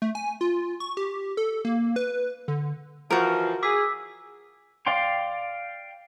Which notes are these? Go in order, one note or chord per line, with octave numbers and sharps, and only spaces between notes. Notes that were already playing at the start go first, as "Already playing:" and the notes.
A3
G#5
F4
C#6
G4
A4
A#3
B4
D3
E3 F3 F#4 A#4
G#4 D6 E6 B6
D5 F5 G5 C6